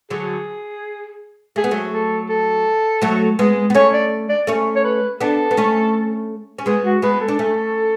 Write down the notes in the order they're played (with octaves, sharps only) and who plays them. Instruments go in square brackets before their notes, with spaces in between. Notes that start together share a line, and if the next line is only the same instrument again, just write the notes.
[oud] D3 F#3 [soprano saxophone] G#4
[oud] A3 [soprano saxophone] G#4
[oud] B3
F#3 A3
[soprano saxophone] A4
A4
[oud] F#3 A3
G#3 B3
B3
[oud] A3 C#4 [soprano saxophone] C#5
[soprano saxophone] D5
D5
[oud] A3 C#4
[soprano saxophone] C#5
B4
[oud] B3 D4 [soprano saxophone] A4
[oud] B3
A3 C#4
C#4
[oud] G#3 B3 [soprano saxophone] G#4
[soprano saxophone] F#4
[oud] G#3 B3 [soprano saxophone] B4
[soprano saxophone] A4
[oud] D4
A3 C#4